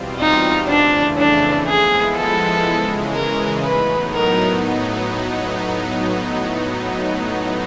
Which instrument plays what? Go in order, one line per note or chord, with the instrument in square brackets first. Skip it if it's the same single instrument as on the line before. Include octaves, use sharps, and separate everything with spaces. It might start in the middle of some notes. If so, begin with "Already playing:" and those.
Already playing: [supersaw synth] E2 B2 G3 C4 F4
[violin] D#4
[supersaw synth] F2 C#3 E3 A3 [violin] D4
[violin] D4
[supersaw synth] F3 G#3 B3 E4 [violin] G#4
[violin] A4
[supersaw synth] C#3 E3 G#3
[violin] A#4
[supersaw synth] A2 F#3 B3 D#4 [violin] B4
[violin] A#4